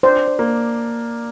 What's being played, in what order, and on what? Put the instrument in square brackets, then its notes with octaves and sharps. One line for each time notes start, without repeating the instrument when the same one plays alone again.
[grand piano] D4 [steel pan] C5
[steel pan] C5
[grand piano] A#3